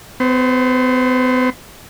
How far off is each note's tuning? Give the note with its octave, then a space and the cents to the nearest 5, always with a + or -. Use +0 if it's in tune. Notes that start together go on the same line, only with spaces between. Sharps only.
B3 +45 C5 +20